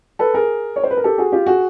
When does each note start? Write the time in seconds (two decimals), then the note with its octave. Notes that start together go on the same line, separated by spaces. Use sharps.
0.19 A4 B4
0.34 G#4 A#4
0.76 C#5
0.84 C5
0.90 B4
0.97 A#4
1.04 G4 A4
1.18 F#4 G#4
1.32 F4 G4
1.46 F#4 G#4